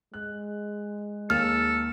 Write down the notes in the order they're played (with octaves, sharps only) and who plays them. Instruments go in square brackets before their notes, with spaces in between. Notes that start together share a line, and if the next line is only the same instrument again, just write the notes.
[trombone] G#3 [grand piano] F#6
[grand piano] D#2 A#3 G#4 [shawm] A4 [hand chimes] F6